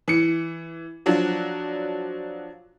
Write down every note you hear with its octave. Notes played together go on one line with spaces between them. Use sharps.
E3 C#7
F3 F#3 D4 F#4